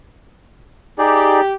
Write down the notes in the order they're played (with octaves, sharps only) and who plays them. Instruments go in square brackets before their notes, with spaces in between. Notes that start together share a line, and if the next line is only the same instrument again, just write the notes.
[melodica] D#4 G#4 D5 [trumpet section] G4